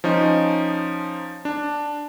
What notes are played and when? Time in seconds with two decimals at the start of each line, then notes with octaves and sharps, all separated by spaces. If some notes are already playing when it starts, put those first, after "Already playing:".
0.04 F3 C#4 D#4
1.45 D4